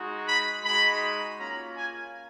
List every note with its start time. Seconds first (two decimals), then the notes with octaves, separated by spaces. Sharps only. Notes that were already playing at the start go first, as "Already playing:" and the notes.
Already playing: G#3 D#4 F#4
0.26 B5
0.63 G#3 D#4 F#4 B5
1.38 A#3 C#4 F4 A#5
1.75 G#5